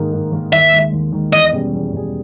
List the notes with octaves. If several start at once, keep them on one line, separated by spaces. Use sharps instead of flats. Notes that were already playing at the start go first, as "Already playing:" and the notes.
Already playing: G#2 D#3 A#3 D#4 A#4
G#2
D#3 A#3 D#4 A#4
D#2 E5
D#3 G#3
D#2
D#3 G#3
E2 D#5
B2 G3 C#4 G#4
E2
B2 G3 C#4 G#4